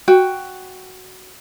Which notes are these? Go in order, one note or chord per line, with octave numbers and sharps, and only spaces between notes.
F#4 G5